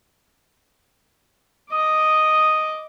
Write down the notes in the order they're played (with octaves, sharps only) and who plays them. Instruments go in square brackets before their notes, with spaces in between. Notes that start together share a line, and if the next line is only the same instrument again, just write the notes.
[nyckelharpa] D#5 D6 [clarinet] D#6